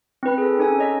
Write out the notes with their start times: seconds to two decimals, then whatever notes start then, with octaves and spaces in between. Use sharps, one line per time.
0.23 C4 E4 B4 B5
0.38 G#4 A4
0.59 C#4 D#4 A4 G#5
0.78 C#5 D#5 B6